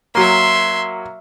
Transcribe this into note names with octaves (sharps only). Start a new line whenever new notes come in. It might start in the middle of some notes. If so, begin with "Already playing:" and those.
F#3 A#3 E5 C6